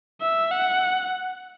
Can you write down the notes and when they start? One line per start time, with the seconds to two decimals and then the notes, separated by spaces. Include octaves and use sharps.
0.21 E5
0.51 F#5